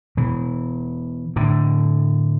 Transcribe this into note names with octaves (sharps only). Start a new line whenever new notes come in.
B2 E3
A2 D3